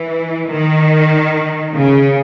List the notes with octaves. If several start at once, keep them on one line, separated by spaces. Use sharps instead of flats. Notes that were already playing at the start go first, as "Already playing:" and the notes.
Already playing: E3
D#3
C#3